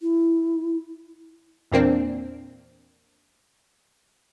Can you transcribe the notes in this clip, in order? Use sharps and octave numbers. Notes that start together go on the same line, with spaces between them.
E4
E2 A#2 A#3 C4 D4